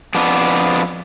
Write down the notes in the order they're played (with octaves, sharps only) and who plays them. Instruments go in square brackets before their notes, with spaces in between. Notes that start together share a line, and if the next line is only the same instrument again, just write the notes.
[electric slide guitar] F2 B3 D4